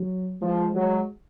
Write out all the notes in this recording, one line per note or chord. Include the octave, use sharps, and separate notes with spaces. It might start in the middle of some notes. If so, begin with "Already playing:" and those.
Already playing: F#3
F3 G#3
F#3 G#3